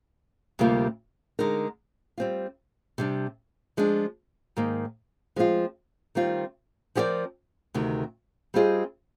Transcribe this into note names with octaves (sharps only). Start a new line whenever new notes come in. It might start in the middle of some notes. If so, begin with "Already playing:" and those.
D2 C3 G3 A#3 F4
D3 G#3 D#4 A#4
G3 C4 F4
C3 G3 D4
F3 G#3 D4
G#2 D#3 A#3
F3 G#3 C4 F4
D#3 G3 C4 F4
F3 C4 G4 A#4 D5
D2 C3 D#3
G3 C4 F4 G#4 D#5